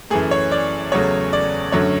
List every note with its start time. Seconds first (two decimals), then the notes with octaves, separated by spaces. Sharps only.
0.10 F#2 E3 A3 G#4
0.31 C#5
0.52 D5
0.92 E2 C#3 F#3 A3 C#5
1.33 D5
1.72 F#2 D3 F#3 A3 C#5